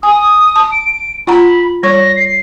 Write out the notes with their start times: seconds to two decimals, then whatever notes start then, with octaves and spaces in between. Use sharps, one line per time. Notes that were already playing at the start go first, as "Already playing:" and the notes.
0.03 G#5 D#6
0.56 A5
0.72 D7
1.27 F4 F#5 A#5 B5
1.83 G3 C#5 C#6 A#6
2.16 C7